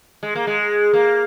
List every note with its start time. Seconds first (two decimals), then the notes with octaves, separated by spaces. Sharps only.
0.23 G#3
0.35 A#3
0.47 G#3
0.94 A#3